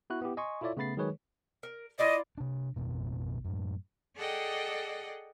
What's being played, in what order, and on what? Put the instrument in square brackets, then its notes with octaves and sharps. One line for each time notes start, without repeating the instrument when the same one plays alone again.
[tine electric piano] B3 E4 F#4 F#6
B3 E4 G4
D#5 G#5 C6 C#6
E4 F4 A4 C#5 D5 E5
C#3 A3 B3 B5 A6 C7
D#3 F#3 G#3 G#4 B4 C#5
[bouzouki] A#4
[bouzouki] E4 F4 D5 [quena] D#5
[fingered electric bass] C3 D4
A1 F2 B2
F#2 A2
[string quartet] G#4 A4 D5 D#5 F#5 G5